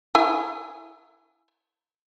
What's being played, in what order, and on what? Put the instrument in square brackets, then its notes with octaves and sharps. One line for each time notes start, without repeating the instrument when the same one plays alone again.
[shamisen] E4 G#5